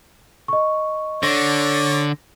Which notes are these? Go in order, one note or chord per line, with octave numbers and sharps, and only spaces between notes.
D#5 C#6
D3 C#5 D5 A#6